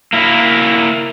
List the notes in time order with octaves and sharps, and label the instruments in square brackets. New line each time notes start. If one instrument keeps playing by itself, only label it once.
[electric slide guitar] A#3 E4